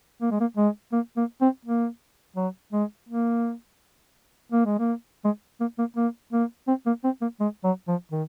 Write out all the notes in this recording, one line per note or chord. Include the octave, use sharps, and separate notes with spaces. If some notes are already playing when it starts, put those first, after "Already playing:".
A#3
G#3
A#3
G#3
A#3
A#3
C4
A#3
F#3
G#3
A#3
A#3
G#3
A#3
G#3
A#3
A#3
A#3
A#3
C4
A#3
C4
A#3
G#3
F#3
F3
D#3